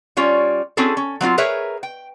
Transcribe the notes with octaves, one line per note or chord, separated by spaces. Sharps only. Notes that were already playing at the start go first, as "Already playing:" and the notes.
G3 C#4 F4 C#5
C4 C#4 E4 F#4 G#4 A4
C#4
F#3 C4 D#4 F4
G#4 A#4 B4 C#5 E5
G5